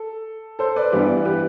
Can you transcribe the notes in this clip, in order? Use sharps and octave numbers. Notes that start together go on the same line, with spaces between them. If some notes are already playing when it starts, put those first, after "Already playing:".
Already playing: A4
A4 C5
B4 D5
G2 E3 G3 B3 G4 B4
G4 B4